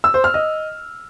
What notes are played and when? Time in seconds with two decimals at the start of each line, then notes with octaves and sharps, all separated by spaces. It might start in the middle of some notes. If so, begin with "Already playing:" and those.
0.04 E6
0.14 C5
0.24 F6
0.34 D#5